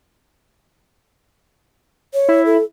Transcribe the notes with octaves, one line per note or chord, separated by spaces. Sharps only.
C#5
E4
A4